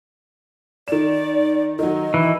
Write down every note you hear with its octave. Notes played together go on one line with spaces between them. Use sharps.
D#3 D5 E7
D#3 F#3 D#5
E3